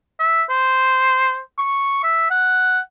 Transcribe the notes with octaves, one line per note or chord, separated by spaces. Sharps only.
E5
C5
C#6
E5
F#5